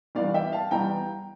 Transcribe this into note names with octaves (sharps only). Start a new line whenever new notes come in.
E2 E3 G3 D5 F5
E5 G5
F5 A5
E2 E3 G3 G5 A#5